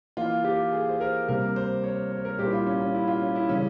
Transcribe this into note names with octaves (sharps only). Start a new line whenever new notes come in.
E3 A#3 F4
G4
G#4
C5
A#4
C3 G3 A#3 A#4
C5
C#5
C#5
A#4
A#2 G3 A#3 G4
E4
F4
C#4
C#4
E4
F4
C#4
E4
C#3 E3 G3 C#4